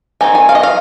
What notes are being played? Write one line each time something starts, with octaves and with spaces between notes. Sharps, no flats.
D#3 C4 D#4 G#5
G#5
F5
D#5
F5